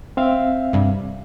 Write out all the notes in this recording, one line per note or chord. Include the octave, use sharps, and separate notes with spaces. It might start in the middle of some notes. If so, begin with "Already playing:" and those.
C4 E5 F5
G2 C3 G3